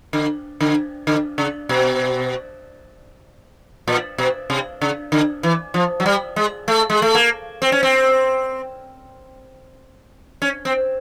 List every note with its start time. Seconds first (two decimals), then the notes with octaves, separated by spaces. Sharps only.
0.13 D3
0.61 D3
1.07 D3
1.38 C#3
1.69 B2
3.87 A#2
4.18 B2
4.50 C3
4.81 C#3
5.12 D3
5.43 E3
5.74 F3
6.00 F#3
6.06 G3
6.36 G#3
6.68 A3
6.90 G#3
7.02 A3
7.15 A#3
7.62 C4
7.72 C#4
7.83 C4
10.42 C#4
10.65 C4